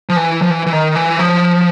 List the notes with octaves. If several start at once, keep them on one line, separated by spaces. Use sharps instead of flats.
F3
E3
F3
E3
E3
D#3
E3
F3